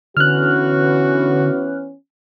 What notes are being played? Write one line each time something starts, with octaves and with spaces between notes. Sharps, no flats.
D3 E3 B3 C#4 F#4 F6 F#6